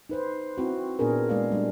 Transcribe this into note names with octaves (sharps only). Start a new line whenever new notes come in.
D#4 B4 C5
C4 E4 F#4
A#2 B3 D4 G#4 A#4
G#3 A#3 D5 F5
G3 A3 D4